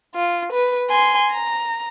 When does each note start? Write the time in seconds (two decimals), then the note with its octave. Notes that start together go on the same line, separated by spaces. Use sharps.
0.15 F4
0.52 B4
0.89 G#5 C6
1.31 A#5